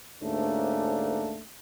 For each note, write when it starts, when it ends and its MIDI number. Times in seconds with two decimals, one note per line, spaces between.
0.22 1.42 38
0.22 1.42 44
0.22 1.42 57
0.22 1.42 58
0.22 1.42 61
0.22 1.42 62